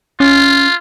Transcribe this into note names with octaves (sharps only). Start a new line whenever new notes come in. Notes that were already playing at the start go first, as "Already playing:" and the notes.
C#4 F4